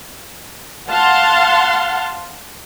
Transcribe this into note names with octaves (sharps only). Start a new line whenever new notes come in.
F5 F#5 A5 C6